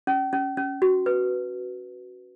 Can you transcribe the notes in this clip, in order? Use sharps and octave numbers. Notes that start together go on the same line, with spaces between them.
C#4
C#4
C#4
F#4
B4